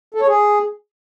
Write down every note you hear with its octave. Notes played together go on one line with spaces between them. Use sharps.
A4
C#5
G#4